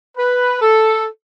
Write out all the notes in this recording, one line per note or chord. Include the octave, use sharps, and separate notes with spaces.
B4
A4